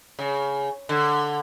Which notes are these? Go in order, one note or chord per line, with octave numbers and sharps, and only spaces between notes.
C#3
D3